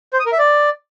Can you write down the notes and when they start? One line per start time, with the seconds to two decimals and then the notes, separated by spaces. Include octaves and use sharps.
0.13 C5
0.19 D#6
0.26 A#4
0.32 E5
0.38 D5